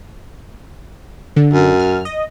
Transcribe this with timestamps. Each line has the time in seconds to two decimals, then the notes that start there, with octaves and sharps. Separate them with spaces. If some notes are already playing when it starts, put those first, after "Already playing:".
1.36 D3
1.54 F#2
1.80 F6
2.05 D#5